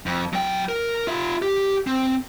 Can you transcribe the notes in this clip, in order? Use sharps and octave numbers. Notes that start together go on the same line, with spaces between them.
F2
F#3 G5
A#4
F4 E5
G4
C4